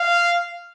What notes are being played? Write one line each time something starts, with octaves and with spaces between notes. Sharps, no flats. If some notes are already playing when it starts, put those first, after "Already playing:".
Already playing: F5